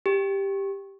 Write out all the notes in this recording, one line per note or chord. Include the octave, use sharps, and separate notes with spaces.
G4